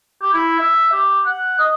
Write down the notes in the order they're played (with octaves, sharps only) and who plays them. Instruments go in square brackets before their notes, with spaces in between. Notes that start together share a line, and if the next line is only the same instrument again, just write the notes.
[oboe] G4
E4
E5
G4
F#5
D#5